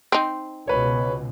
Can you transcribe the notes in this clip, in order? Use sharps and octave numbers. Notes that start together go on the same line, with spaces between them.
C4 D#4
C#2 B2 B4 C#5